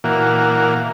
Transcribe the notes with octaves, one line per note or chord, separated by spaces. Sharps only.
A#2 E3 A#3 F#4 F5